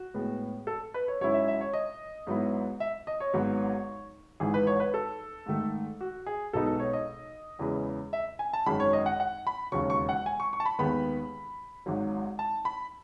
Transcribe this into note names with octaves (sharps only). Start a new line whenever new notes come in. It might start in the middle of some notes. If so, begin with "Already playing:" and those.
Already playing: F#4
A2 G#3 B3
A4
B4
C#5
G#2 F#3 C#4 E4 C#5
E5
E5
C#5
D#5
G#2 F#3 B3 E4
E5
D#5
C#5
G#1 G#2 F#3 B3
G#1 G#2 E3 G#4
B4
C#5
B4
A4
G#2 D#3 A3
F#4
G#4
B1 B2 G#3 B3 D#4 A4
A4
C#5
D#5
E2 C#3 E3 G#3
E5
G#5
A5
G#1 F#2 D#3 G#3 B5
C#5
D#5
F#5
F#5
B5
E1 D#2 C#3 F#3 C#6
C#6
F#5
G#5
C#6
C#6
A5
B5
D#2 D#3 G#3 B3 B5
G#1 G#2 F#3
A5
B5